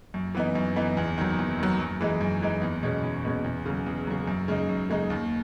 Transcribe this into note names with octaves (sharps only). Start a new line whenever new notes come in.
F#2
E3 B3 D#4
F#2
E3 B3 D#4
E2
D#3 F#3
E2
D#3 F#3
F#2
E3 G#3 D#4
F#2
E3 G#3 D#4
E2
B2 G#3 C#4
E2
B2 G#3 C#4
E2
C#3 F#3
E2
C#3 F#3
F#2
C#3 G#3 D#4
F#2
C#3 G#3 D#4
D#2